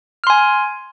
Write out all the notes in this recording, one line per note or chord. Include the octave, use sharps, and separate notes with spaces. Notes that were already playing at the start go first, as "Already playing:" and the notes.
G#5 C6 F6